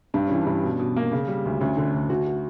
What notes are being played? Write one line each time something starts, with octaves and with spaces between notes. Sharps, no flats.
G2 D4
E3 C#4
D4
G2
B2
B2
A#3
C#3
G3
D2
D2 C#4
D3 D4
D2
D2 F#4
F#4